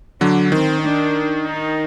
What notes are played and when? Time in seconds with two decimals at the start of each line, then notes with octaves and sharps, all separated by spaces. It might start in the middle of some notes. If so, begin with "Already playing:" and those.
0.21 D3 F#3 D4
0.52 D#3 C4
0.82 D4
1.45 D#4